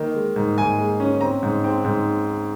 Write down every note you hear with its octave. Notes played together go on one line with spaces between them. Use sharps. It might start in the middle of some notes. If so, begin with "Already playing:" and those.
Already playing: D#3 A#3
G#3
G#2
G#2 G#5
G#3
C#4
C4 A#5
G#2
C4
G#2